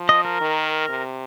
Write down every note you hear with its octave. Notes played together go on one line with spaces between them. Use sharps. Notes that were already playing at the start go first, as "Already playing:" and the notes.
Already playing: F3
D#5
A#4
D#3
C3